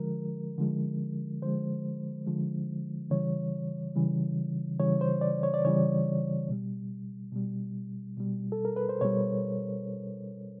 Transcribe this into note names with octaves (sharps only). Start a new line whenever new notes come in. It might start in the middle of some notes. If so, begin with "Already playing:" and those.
Already playing: D3 F3 G#3 A#4
D3 F3 G#3
D3 F3 G#3 C5
D3 F3 G#3
C#3 E3 G3 C#5
C#3 E3 G3
C#3 E3 G3 C#5
C5
D5
C#5
D5
C#3 E3 G3 C#5
B2 G3
B2 G3
B2 G3
A4
A#4
B4
C5
B2 G3 C#5